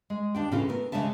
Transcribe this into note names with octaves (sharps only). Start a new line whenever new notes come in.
G#3
D#2 D4 G5
A2 C#3 E3 C#4 F4 G#4
A3 B3 A#4
D#2 C#3 G#3 C#4 E5 A5